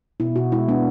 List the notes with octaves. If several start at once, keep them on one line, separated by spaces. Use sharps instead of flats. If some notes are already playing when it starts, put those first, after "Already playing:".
B2 E4
B2 F#4
G#3 E4
B3 D4